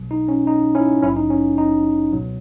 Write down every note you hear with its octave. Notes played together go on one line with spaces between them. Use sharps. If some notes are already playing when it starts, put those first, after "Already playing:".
Already playing: B1 B2 F#3
D#4
C#4
D#4
C#4 E4
A#1 G#2 F#3 C#4 E4
D#4
C#4
D#4
C#2 B2 F#3